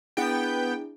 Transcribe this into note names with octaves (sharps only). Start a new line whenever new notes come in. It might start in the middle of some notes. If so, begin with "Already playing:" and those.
B3 D4 E4 G#4 G5